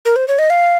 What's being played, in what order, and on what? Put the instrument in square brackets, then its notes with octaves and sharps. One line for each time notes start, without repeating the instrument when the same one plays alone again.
[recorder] A#4
C5
C#5
D#5
F5